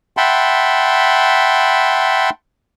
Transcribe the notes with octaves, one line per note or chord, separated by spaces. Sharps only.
E5 F#5 G5 A5 B5 C6